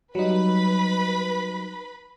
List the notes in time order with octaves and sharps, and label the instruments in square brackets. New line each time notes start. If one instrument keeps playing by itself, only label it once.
[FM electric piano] F#3 G3 D#4 [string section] B4 B5